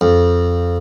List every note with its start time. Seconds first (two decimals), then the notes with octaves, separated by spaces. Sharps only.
0.01 F2